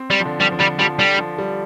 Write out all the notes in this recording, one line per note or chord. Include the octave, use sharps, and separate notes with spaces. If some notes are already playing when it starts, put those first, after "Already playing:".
Already playing: C4
G3
F3
D3
F3 G3
F3
D3 G3
F3 G3
D3 G3
F3
G3